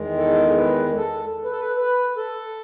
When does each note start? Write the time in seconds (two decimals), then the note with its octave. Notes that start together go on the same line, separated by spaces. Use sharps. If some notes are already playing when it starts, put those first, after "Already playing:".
Already playing: E2 D#3 G#3
0.18 A4
0.58 B4
0.97 A4
1.44 B4
1.52 A4
1.60 B4
1.77 B4
2.17 A4